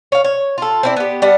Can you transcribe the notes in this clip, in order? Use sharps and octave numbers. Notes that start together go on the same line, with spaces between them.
C#5 F5
C#5
F4 A4
C4 E4 D5
B3 G4
G3 B3 D4 F#5